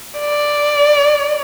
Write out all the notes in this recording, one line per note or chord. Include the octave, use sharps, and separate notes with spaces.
D5